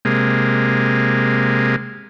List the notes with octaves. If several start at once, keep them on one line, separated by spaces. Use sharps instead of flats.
C3 G#3 A#3